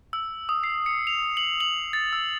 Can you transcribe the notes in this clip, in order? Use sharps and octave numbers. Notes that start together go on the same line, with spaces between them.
E6
D#6
C7
C#7
F7
F#7
F#7
A6
E6